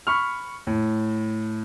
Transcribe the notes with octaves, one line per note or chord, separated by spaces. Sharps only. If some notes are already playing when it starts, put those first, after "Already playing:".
B5 C#6 F6
A2